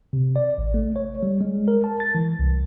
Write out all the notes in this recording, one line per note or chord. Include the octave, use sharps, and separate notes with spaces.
C3
D5
A1
A3
C#5
G3
G#3
A#4
A5
A6
E3
C2